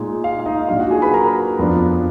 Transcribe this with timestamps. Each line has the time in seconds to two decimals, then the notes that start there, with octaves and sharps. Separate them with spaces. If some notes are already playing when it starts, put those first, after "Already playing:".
Already playing: A#2 G#3 D#4
0.24 F4 F5
0.40 F5
0.46 D#4 D#5
0.68 A#2 F#3 D4 F4 F5
0.80 F#4 F#5
0.91 G#4 G#5
1.02 B4 B5
1.13 A#4 A#5
1.59 F2 F3 B3 D4